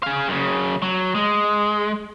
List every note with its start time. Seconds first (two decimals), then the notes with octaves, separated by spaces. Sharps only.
0.03 G#4 F5
0.28 F#2 C#3
0.82 F#3
1.15 G#3